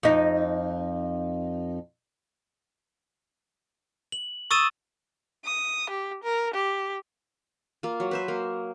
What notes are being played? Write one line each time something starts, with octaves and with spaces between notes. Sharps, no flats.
F2 D#4
F#7
C#6 D#6 E6 A6 D#7 E7
D#6
G4
A#4
G4
A#3 F4
F#3
B4 C5 E5
A#3